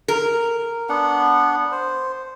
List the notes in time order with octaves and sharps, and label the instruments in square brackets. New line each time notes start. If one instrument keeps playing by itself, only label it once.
[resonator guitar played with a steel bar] A#4
[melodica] B3 D4 F#5
C5